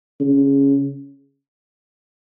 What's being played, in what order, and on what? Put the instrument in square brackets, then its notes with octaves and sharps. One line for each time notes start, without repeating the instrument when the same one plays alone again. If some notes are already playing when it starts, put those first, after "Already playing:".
[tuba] C#3